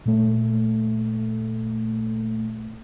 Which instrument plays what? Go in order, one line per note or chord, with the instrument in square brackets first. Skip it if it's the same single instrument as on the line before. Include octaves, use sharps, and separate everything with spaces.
[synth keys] A#2 A3